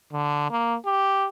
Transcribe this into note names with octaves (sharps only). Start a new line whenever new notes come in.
D3
A#3
G4